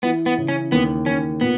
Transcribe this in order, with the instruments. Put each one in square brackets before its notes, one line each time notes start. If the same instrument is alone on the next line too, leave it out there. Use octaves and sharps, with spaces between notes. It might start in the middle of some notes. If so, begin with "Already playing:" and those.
[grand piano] E3 [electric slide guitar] B3
[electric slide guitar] B3
[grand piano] C#3
[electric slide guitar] C#4
[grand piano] D#2 [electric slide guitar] B3
[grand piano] D#2 [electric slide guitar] C#4
[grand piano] A#2 [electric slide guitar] B3